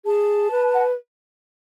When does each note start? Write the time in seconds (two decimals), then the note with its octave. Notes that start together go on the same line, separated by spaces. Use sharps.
0.06 G#4 A5
0.51 B4
0.74 F#5